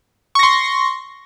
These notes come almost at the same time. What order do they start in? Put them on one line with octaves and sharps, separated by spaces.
C#6 A#6 C6